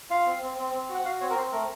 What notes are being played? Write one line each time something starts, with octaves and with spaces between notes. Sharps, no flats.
F4 F5
C4
C4
C4
C4
F#4
F#5
F#4 F5
C4 C#5
A#4
C4 C5
A3 A#4